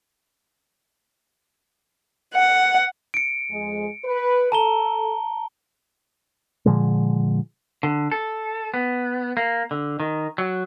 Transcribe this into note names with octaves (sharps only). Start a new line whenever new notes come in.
F#5
C#7 D7
F2 G#3
B4
A4 A5 A#5 G7
A#2 D3 F3 G#3
D3
A4
B3
A#3
D3
D#3
F#3